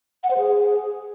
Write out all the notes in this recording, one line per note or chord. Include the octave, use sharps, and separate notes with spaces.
F#5
C5
G#4